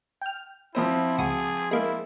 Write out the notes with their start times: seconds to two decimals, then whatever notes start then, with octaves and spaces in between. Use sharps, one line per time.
0.21 G5 F6
0.75 F3 C4 E4 C5
1.18 C#2 F#4 G#4 D#6
1.71 G#3 A#3 E4